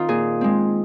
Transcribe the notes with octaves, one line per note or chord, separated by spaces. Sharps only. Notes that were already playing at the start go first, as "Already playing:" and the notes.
Already playing: D#3 C4 D#4 F4
A#2 G#4
G#3 C4